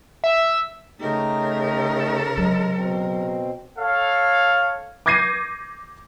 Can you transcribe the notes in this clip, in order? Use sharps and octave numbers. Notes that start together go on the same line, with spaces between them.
E5
C#3 A3 D#4 G4 A#4
F#3 G#3
B2 C4
A4 C#5 F5
D6 G6 G#6 A#6 C7 D#7